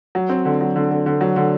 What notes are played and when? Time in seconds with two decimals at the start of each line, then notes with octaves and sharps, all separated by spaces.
0.15 F#3
0.29 C4
0.45 D3
0.61 F#3
0.76 D3
0.91 D3
1.06 D3
1.21 F#3
1.36 D3